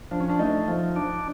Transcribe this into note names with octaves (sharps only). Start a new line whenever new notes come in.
F3 D4
C#4
D4
A3 D#4
F3
D4